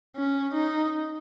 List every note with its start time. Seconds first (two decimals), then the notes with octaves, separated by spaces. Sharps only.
0.16 C#4
0.54 D#4